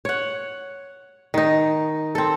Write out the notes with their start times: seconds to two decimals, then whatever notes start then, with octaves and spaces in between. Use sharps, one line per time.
0.05 C#5 F#5
1.34 D#3 D#4
2.15 C4 A4